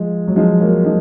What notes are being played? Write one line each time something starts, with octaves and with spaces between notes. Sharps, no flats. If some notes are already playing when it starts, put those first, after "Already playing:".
Already playing: F3 G#3
F#3
F3 G#3
F#3 A#3
F3 G#3